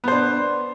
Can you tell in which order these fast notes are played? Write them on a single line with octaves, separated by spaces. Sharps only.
B3 C5 D4